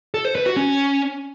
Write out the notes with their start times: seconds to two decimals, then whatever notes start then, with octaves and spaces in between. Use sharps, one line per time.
0.14 A4
0.25 C5
0.35 B4
0.46 F#4
0.57 C#4